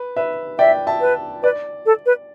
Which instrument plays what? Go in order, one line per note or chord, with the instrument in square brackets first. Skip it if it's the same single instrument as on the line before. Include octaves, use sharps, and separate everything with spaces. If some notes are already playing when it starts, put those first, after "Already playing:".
Already playing: [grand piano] B4
B4 E5
[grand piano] D5 G5 [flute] E5
[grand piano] E5 A5
[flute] B4
[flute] B4 [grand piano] D5
[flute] A4
B4